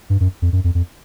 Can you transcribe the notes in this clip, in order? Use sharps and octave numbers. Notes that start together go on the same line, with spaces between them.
G2
F#2
F2
F#2
F2
F2